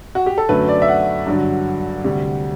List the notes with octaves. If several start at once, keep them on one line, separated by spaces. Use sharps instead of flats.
F#4
G4
A4
F#2 D3 F#3 A3 B4
D5
E5
F#5
G2 D3 F#3
D2 C3 G3